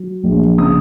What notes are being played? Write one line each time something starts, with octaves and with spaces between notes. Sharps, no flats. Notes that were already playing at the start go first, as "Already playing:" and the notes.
Already playing: F#3
A#1
C#3 D#6